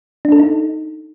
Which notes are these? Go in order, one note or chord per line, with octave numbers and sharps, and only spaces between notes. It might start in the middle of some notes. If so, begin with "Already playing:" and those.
D4
A4
D#4